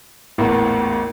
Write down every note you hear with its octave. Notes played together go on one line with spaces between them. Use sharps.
A#1 E2 A2 E4 A#4